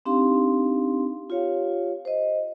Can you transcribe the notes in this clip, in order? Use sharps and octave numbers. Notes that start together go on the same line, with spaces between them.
C4 D4 D#4 G4 F5 C6
F4 G4 C#5 F5
C5 D#5